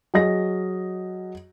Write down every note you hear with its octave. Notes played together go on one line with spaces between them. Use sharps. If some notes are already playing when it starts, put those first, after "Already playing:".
F#3 G#4 D#5 A#6